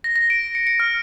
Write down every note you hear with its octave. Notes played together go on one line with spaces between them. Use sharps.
A#6
A#6
D7
C#7
C#7
F6